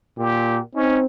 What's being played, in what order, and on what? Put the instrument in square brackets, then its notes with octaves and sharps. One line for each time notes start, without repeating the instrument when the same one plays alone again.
[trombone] A#2 [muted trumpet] G4
[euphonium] C4 [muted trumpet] C#4 [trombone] D#4